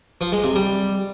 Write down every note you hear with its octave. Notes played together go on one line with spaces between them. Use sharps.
F3
G#3
C3
G3